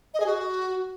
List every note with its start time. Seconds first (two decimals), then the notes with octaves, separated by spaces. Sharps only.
0.14 D#5
0.20 G#4
0.26 F#4